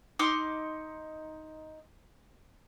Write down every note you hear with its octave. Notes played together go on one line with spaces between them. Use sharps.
D#4 C6 D6 F6